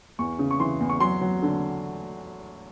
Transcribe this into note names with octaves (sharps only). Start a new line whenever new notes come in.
E2 C#6
C#3
C#6
E3 C6
E2
C#6
F#3 C6
F#3
D3